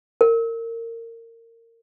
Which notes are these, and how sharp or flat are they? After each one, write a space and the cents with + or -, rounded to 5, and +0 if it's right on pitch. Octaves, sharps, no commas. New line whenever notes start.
A#4 -25